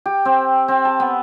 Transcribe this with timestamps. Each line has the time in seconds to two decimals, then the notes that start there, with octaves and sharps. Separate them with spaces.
0.06 G4
0.25 C4
0.68 C4
0.85 A5
1.00 B3